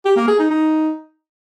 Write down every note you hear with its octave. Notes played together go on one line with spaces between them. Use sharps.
G4
A#3
G#4
D#4
D#4